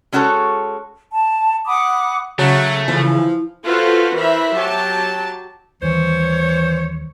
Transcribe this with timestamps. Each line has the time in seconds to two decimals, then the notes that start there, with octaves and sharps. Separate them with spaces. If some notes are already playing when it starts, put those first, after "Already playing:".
0.12 G#3 C#4 F#4 G#4 A4 C#5
1.12 A5
1.66 F#5 B5 D6 D#6
2.39 C#3 F#3 A3
2.88 E3 F3
3.64 F4 F#4 A4 B4 C5
4.15 E3 A#4 C5 E5 B5
4.55 F#3 G4 A5
5.82 D#2 D#3 E3 G3 C5 C#5